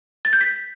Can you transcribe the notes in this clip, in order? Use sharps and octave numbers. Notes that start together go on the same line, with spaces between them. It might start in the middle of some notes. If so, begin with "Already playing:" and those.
A6
G6
B6